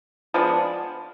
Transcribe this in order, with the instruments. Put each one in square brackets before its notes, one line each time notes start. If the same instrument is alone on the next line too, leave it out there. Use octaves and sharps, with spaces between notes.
[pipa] F3 G#3 B3 D4